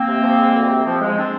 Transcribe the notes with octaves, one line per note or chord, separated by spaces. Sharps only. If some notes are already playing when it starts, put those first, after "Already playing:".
Already playing: A#3 C4
C3
F3
G#3
D2
C3
F3
G#3
C4 D4